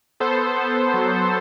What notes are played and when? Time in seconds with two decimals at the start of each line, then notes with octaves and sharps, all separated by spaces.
0.20 B3 A4 C5
0.57 B3
0.94 F#3